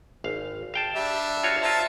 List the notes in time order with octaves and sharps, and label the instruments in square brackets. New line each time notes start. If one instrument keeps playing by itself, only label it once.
[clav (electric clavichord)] G#1 F5
F5 G5 A5
[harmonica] G3 D4 E5
[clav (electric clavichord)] F4 F#4 C#5
[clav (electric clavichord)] F4 A#5 [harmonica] C5 E5 A5